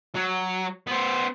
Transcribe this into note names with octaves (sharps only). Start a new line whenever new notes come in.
F#3
B3 C5